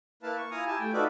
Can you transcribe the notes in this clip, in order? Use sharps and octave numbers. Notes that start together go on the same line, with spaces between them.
A#3 E4 B4 F5 A5
C#6
E4 F4 F5 G#5 A#5 D#6
E4 G4 G#5 A5
A3 G5
D#4 F4 F#4 A4 B4 D5